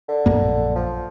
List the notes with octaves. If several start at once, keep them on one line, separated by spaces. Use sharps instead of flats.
D3
A#1 F#2 A#3
F3